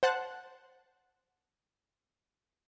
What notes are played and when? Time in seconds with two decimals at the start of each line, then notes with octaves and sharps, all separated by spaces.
0.03 C5 F#5 A5 F#6